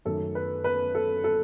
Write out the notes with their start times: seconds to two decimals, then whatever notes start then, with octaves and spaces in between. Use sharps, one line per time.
0.05 F#2 D#3 A3 A4
0.35 B4
0.64 B4
0.95 A4
1.24 A4